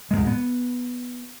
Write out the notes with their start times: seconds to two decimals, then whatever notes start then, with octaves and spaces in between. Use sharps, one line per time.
0.11 D1 E2 G#3
0.27 B3